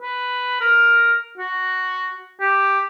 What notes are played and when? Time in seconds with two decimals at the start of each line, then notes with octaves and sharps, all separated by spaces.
0.02 B4
0.61 A#4
1.38 F#4
2.40 G4